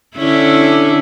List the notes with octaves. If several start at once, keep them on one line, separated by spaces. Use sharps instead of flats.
D3 C#4 E4